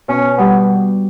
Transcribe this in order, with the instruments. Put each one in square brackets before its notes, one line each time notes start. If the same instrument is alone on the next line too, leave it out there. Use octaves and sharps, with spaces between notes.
[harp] B2 [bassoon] C#4
[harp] G3 [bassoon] B3